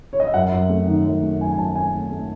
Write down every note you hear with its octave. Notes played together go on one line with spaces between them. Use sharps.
C#5
D#5
E5
F#2 F#5
F#2
A3
D#3
F#2
A3
F#2 G#5
G#5
F#2 A5
A3 G#5
A3
A3